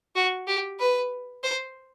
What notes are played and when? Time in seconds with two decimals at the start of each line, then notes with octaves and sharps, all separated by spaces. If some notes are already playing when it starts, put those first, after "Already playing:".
0.15 F#4
0.47 G4
0.79 B4
1.43 C5